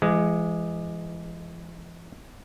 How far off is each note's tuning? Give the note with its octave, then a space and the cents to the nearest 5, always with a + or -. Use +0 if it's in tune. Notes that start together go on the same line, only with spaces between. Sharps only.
E3 +40 G#3 +0